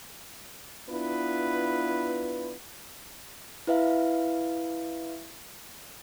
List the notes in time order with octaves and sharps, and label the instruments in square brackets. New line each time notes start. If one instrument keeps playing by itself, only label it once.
[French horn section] B3 D4 E4 F4 B4
[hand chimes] E4 B4 E5 F5